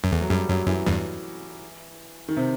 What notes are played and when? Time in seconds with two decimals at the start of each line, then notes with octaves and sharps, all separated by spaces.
0.04 F#2
0.12 E2 A3
0.21 F#3
0.30 F#2 G3
0.49 F#2 F#3
0.67 F#2 E3
0.87 E2 G2
2.28 D#3
2.37 C3